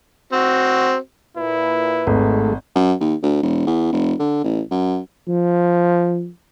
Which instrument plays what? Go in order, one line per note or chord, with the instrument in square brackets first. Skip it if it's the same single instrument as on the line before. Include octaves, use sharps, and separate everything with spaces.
[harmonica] C4 F#4
[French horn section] A#2 B4 [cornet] E4
[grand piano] G#1 [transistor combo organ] G#2 A3
[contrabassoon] F#2
D#2
D2
E1
E2
F1
D3
A1
F#2
[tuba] F3